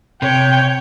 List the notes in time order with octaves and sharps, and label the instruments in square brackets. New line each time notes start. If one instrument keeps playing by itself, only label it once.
[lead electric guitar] C3 [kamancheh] C#5 [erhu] G5